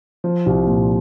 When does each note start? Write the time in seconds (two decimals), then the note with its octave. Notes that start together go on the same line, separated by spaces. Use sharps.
0.24 F3
0.46 C2
0.67 A#2